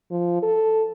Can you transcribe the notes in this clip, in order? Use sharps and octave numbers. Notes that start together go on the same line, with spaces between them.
F3
A4